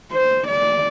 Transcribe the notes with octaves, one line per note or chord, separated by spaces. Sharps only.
C5
D5